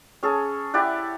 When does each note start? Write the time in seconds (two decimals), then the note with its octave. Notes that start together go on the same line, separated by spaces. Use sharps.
0.23 C#4 G#4 A4
0.74 E4 G4 D5 F#5